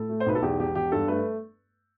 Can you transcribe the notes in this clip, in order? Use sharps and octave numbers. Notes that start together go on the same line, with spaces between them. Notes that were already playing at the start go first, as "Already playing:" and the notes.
Already playing: A2 A4
A3
C5
B1 B4
A4
E2 G4
E1 G4
E1 G4
G2 A4
A3 B4